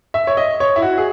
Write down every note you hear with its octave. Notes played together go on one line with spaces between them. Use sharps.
E5
C#5
D#5
C#5
E4
F#4
G#4